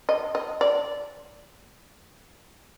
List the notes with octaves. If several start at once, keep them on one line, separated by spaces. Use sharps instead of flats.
D#5
D#5
D5